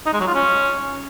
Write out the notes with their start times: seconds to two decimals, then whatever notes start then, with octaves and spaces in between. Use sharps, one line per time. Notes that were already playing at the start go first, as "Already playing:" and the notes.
0.06 D#4
0.13 G#3
0.20 F#3
0.27 F4
0.34 C#4